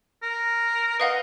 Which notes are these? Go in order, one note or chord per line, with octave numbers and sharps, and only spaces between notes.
A#4
B4 D#5 F5 F#5